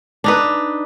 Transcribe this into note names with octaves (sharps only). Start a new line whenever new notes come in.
D4 D#4 B4